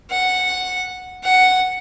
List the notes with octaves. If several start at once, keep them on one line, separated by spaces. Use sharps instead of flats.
F#5
F#5